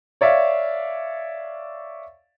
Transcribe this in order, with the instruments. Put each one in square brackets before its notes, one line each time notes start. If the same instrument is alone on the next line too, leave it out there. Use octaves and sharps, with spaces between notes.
[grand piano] C#5 D5 E5 F5